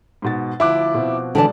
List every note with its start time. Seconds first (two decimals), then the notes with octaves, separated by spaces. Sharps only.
0.22 G#2 B2 A6
0.60 D2 F3 E4 D6 F#6
0.94 B2 F3 C4
1.35 B1 D3 E3 G#3 D5 A5